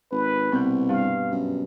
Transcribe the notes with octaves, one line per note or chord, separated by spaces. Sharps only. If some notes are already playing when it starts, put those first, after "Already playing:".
G#1 B4
C2 B2 C4 G6
G2 F5
F#2